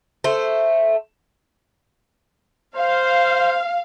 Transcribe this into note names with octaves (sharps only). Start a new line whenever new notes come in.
A3 C5
C5 F5